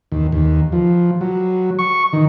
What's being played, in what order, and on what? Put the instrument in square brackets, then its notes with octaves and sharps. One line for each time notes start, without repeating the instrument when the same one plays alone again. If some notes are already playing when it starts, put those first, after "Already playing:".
[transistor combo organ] D#2
D#2
F3
F#3
C#6
D#3